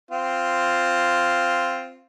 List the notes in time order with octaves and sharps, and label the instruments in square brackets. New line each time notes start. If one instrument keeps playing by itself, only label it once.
[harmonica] C4 F4